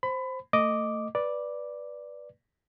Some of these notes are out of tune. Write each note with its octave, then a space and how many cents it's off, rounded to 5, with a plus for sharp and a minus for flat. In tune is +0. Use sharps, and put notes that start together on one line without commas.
C5 +0 B5 +25
A3 +25 D#5 -5 D6 -5
B4 -10 D5 +0